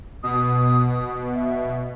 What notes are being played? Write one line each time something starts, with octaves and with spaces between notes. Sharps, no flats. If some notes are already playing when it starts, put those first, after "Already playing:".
B2 D#6
E5